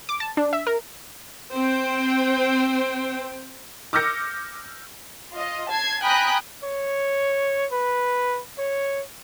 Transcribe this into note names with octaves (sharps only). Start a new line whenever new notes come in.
D6
A5
D4
E5
A#4
C4 C5 G5
D6 E6 F6 G6 A#6 C#7
F4 D#5
A5 G#6 C7
G5 G#5 A#5 B5 D#6 F#6
C#5
B4
C#5